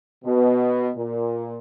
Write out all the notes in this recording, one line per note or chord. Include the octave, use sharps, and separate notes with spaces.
B2
A#2